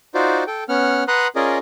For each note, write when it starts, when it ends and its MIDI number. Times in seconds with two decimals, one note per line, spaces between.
0.15 0.44 63
0.15 0.44 65
0.15 0.44 66
0.15 0.44 72
0.15 0.44 74
0.47 0.64 69
0.47 0.64 79
0.69 1.04 59
0.69 1.04 61
0.69 1.04 78
0.69 1.04 89
1.08 1.28 71
1.08 1.28 78
1.08 1.28 82
1.08 1.28 84
1.08 1.28 87
1.08 1.28 90
1.36 1.58 61
1.36 1.58 65
1.36 1.58 68
1.36 1.58 70
1.36 1.58 74
1.36 1.58 75